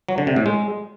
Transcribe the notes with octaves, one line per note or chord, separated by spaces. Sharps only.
F#3
D3
C3
A2
G#3